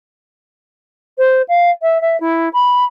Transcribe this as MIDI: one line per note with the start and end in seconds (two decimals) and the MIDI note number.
1.18 1.42 72
1.48 1.70 77
1.82 1.98 76
2.01 2.19 76
2.20 2.49 64
2.53 2.85 83